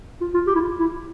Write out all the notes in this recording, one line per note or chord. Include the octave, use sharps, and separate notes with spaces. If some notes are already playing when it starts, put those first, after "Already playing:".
F4
F4
G4
E4
F4
E4